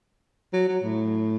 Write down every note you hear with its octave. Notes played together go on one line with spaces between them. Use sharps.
F#3
F#3
A2